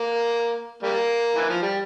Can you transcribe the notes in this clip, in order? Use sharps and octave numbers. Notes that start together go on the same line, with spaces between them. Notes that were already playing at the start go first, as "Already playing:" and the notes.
Already playing: A#3
G3 A#3
E3
F3
G3